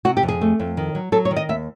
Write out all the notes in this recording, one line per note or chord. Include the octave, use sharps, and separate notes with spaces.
C3 F#4
G4
F2
G#4
A3
F2
D#3
F#3
F#3 A4
C#5
D#3
D#5
D#2 E5